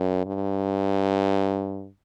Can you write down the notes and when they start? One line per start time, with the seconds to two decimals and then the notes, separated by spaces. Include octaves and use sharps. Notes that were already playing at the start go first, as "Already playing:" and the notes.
Already playing: F#2
0.26 G2